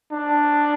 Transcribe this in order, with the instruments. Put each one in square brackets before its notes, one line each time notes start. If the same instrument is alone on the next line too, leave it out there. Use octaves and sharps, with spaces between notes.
[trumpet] D4